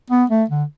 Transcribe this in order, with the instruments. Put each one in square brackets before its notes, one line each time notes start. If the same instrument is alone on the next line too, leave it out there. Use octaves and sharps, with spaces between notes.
[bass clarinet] B3
A3
D3